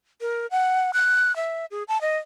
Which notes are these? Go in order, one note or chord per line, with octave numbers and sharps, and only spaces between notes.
A#4
F#5
F#6
E5
G#4
A5
D#5